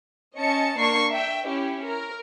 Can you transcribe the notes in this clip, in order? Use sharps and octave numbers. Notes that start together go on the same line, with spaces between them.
C#4 D#5 A5 C#7
A#3 D4 C#6 C7
E5 G5
C#4 E4 G4
A#4